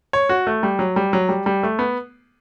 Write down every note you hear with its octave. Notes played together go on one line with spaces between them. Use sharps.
C#5
F#4
A3
G3
F#3
G3
F#3
G3
G3
A3
B3